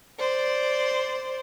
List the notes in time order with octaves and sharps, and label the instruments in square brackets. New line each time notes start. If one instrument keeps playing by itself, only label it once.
[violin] C5 D5